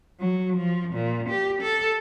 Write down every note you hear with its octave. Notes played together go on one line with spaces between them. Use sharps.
F#3
F3
A#2
G4
A4